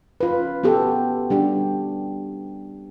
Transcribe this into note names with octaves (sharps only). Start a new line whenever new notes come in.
C#4 F4 B4
B3 F#4 G4 A4
G3 D4 G4